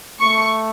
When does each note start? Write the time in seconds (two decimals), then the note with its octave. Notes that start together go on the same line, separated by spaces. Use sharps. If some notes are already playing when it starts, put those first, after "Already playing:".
0.20 A3 C#6